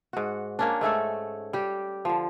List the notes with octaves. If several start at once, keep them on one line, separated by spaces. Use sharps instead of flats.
G#2 F#4
A#3 C#4 D4
G#2 A3 C#4 A4
G3 G4
D3 F3